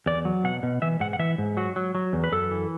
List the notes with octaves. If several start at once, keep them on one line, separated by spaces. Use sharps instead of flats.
E2 D5
F#3
B2 F#5
B2
E3 E5
G#2 F#5
F#5
E3 E5
G#2
F#3 F#4
F#3
F#3
E2
B4
F#2 A4
E3